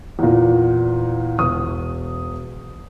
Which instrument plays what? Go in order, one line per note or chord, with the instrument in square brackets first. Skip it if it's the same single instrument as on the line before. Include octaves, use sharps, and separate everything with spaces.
[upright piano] E2 A#2
E1 D#6